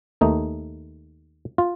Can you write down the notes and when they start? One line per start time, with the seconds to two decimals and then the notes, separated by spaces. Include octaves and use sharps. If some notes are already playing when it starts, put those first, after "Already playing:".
0.21 D#2 D#3 A3 D#4
1.58 F4